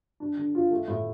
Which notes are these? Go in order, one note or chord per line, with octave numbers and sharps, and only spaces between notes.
D4
D3
F4
A3
A2